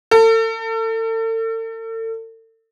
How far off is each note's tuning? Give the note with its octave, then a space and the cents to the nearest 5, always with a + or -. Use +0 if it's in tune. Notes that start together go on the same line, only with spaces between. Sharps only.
A4 +40